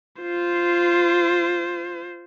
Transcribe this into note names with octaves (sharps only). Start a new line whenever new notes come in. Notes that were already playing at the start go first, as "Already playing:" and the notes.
F4 C5